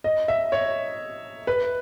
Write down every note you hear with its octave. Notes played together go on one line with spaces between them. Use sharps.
D#5
E5
C#5
B4